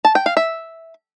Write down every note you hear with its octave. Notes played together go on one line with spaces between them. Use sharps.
A5
G5
F5
E5